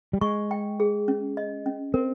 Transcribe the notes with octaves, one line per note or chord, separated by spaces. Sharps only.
G3
G#3 C#6
G5
G#4
C#4
D#5
C#4
C4 A#4